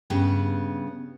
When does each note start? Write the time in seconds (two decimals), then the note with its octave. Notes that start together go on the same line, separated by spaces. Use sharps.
0.10 G2 C#3 B3